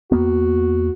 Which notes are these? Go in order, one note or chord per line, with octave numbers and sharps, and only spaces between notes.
E2 A#3 B3 F#4